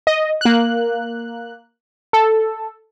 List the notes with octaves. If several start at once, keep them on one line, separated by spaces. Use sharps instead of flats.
D#5
A#3 F#6
A4